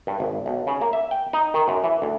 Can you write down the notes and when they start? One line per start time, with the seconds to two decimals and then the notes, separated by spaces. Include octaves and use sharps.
0.07 G2
0.20 G#1
0.46 B1
0.67 C#3
0.81 A#3
0.93 E5
1.11 G5
1.33 D#4
1.54 D#3
1.68 F#2
1.84 E3
2.02 D2